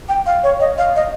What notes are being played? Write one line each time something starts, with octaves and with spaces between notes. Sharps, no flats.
G5
F5
C#5
D#5
F5
D#5